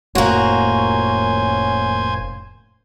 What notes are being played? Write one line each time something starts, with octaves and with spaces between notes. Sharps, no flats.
F1 A2 A#3 C#4 F#4 C5 G#5